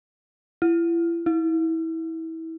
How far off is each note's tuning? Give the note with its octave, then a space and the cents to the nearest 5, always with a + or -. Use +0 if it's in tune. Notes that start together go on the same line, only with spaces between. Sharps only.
E4 +35
E4 -25